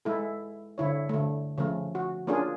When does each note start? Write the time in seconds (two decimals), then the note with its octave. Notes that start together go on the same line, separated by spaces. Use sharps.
0.05 G#3 E4 A4
0.78 D3 E4 C#5
1.09 D3 A3
1.58 C#3 F3 A3
1.95 F#4
2.27 A#3 C#4 D4 F4 G#4